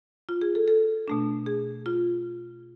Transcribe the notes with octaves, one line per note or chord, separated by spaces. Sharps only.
F4
G#4
A4
A4
B2 A3 D4
G#4
F4